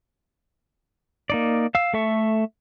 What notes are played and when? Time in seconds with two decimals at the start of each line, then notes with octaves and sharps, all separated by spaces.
1.30 A#3 D#4 D5
1.75 F5 E6
1.94 A3 A4 E5 C#6